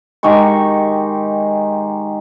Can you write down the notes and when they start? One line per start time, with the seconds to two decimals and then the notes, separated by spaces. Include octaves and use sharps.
0.23 D#3 G#3 G4 C#6